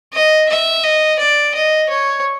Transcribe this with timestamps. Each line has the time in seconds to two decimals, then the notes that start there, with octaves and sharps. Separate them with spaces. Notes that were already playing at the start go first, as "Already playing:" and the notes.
0.13 D#5
0.49 E5
0.83 D#5
1.20 D5
1.55 D#5
1.90 C#5